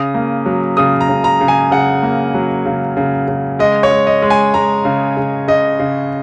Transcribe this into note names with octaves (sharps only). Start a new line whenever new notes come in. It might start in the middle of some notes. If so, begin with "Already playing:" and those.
Already playing: C#3 D#6
A#3
F#3
C#3 D#6
A#5
C#3
A#5
C#3
G#5
C#3 F#5
A#3
F#3
C#3
C#3
C#3
G#3 D#5
C#5
G#3
D#5
G#3
G#5
G#3 A#5
C#3
C#3
C#3 D#5
C#3